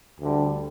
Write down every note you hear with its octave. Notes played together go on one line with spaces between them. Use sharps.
D2 D3 G3